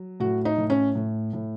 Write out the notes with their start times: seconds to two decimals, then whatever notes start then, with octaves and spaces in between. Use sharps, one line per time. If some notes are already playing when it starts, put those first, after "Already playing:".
Already playing: F#3
0.20 A2 F#4
0.45 D#4
0.58 A2
0.70 C#4
0.95 A2
1.33 A2